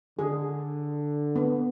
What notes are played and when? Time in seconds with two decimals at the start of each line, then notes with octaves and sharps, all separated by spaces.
0.19 D3 G#4
1.36 B3